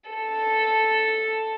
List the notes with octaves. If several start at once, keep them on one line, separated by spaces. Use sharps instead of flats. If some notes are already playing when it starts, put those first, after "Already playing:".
A4